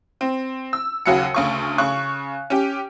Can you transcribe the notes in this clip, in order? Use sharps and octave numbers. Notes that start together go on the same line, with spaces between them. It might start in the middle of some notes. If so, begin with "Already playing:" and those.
C4
E6
D#2 C#3 F#3 F#5 C#7
D2 C#3 C#6
C#3 C#6 F#6
C#4 G4